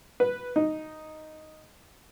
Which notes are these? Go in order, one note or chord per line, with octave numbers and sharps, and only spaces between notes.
B4
D#4